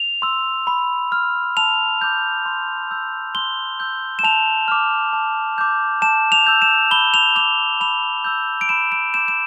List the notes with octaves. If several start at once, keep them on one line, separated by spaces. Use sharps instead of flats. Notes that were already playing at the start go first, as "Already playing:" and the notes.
Already playing: F7
C6 E6
B5
F6
A5 F7
D6 G6
C6
E6 G6
C6 G7
E6 G6
E7
A5 F7
D6 F6
A5
D6 G6
A5 E7
F7
E6 G6
E7
B5 G7
F7
D6 G6 F7
B5 F7
E6 G6
D7
B5 E7
D7
D6 G6 E7
E7